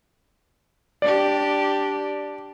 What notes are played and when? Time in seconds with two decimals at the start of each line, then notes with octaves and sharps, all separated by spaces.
1.02 D4 G4 D5